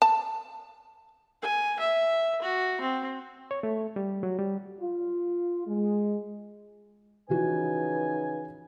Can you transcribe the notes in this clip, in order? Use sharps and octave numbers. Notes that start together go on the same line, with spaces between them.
A5
G#5
E5
F#4
C4
C#5
A3
G3
F#3
G3
F4
G#3
C#3 E3 F3 D#4 F#4 B4 G#5